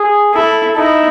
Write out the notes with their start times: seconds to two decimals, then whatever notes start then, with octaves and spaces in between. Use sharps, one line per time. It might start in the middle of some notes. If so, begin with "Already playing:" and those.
Already playing: G#4
0.34 E4 A4
0.76 D#4 E4